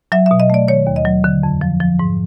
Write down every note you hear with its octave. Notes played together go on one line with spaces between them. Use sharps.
F#3 E5
E5
B2
D#5
A3 D5
D#3 C#5
D#2
D#5
F#3
D3
F2
F3
F3
G#2